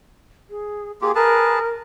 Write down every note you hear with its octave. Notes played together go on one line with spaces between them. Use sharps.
G#4
A#3 F4 G4 G#4
G#4 A#4 B4 A5